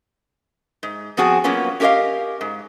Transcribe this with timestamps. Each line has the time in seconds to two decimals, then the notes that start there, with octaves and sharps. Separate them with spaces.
0.83 G#2
1.17 F3 B3 C4 F#4 G#4 G#5
1.44 F#3 A#3 B3 C#4 F4
1.80 C#4 G4 A#4 B4 D#5 F5
2.41 G#2